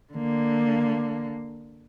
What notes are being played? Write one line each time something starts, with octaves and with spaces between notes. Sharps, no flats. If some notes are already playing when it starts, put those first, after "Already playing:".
D3 A#3